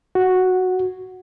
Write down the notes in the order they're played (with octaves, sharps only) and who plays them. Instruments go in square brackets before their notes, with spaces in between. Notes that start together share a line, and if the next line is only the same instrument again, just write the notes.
[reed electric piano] F#4